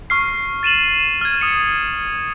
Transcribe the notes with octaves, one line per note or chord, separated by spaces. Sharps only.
C#6 F6 C7
A6 D#7 E7 F#7
F6 G#6
D#6 C#7